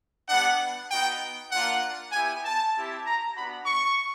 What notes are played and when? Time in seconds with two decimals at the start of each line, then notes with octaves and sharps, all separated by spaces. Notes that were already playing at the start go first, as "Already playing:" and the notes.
0.28 G3 B3 D4 F#5
0.90 B3 D#4 F#4 G5
1.51 A#3 D4 F4 F#5
2.12 B3 E4 G4 G#5
2.44 A5
2.74 C4 E4 G4
3.05 A#5
3.35 B3 D4 F#4 B5
3.65 C#6